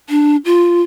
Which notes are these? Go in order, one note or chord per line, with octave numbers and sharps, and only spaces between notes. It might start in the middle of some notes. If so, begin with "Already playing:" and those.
D4
F4